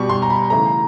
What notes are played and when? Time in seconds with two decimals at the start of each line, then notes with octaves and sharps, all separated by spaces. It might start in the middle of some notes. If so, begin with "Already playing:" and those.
Already playing: B2 G3 C#6
0.09 C6
0.22 A#5
0.30 B5
0.50 C#3 E3 A3 A#5